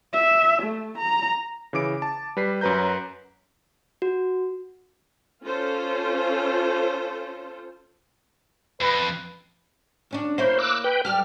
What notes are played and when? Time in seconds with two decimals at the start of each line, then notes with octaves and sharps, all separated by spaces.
0.13 E5
0.63 A3
0.98 A#5
1.73 C#3 E3 D6 D7
2.02 A5
2.37 G3 B4 B6 C7
2.61 F#2 F#3 B4 A#5 G6
4.02 F#4
5.44 C#4 F4 A4 C5
8.81 F2 B4
10.11 D2 C#4 D4
10.38 A#3 E4 C5 C#5
10.59 D6 E6 F#6
10.84 B4 G5
11.05 G3 G4 A4 F6